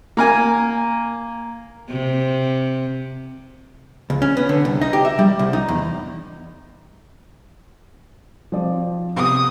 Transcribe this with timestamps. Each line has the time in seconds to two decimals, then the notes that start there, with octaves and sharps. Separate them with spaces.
0.17 A#3 A#4 G#5
1.90 C3
4.10 C#2
4.22 C#4
4.37 B3
4.49 D3
4.65 C2
4.81 D#4
4.93 G4
5.05 E5
5.19 G3
5.39 C2
5.53 D#4
5.68 E2
8.52 F3 C4 D5
9.16 C3 B3 D#6